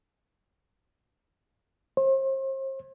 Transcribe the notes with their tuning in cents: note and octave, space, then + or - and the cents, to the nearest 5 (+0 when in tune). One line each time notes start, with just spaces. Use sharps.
C5 +40